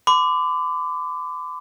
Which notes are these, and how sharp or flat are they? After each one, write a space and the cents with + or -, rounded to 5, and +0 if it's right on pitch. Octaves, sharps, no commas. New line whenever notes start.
B5 +45 D6 +0